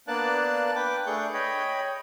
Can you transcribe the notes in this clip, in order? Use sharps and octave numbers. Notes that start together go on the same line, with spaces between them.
A#3 B3 D4 D5 A5 F#6
B4 G5 D6
A3 D4 G#4 C#6 G6
C#5 D#5 G5 B5